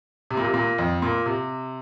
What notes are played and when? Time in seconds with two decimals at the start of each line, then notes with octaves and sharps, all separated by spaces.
0.31 C3
0.37 A#2
0.45 C3
0.54 A#2
0.78 F2
1.02 A#2
1.26 C3